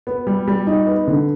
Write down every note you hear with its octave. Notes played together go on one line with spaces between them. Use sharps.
B3
G3
G3
D#4
B3
D3